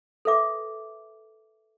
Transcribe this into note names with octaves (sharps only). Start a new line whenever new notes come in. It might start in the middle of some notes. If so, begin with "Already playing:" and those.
A4 B4 E5 D6